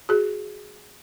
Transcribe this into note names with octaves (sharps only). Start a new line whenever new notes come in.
F#4 G#4